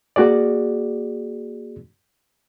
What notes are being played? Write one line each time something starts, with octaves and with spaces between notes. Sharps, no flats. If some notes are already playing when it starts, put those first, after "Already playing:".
A#3 F#4 G#4 D5